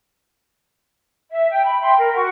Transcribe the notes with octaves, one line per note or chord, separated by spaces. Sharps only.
E5
G5
B5
E5 G5 C6
A#4
F#4 F#5 C#6